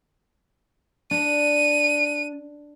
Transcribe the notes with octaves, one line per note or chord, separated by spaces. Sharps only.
D4 D#7